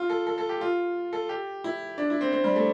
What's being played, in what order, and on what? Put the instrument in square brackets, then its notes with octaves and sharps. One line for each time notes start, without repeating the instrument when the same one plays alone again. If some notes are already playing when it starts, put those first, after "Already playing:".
Already playing: [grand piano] F4
A4
A4
A4
G4
F4
A4
G4
E4
D4
E4
C4
C4
G3
A3